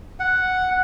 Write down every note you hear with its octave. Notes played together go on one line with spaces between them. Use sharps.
F#5